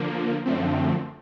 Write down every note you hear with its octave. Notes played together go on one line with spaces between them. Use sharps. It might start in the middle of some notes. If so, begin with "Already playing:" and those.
Already playing: D3 F3 A#3
F#2 D3 F3 A3 C4